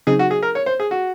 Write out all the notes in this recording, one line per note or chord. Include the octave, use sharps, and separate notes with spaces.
C#3 F#3 C4 D#4 G#4
F#4
G#4
A#4
C#5
C5
G#4
F#4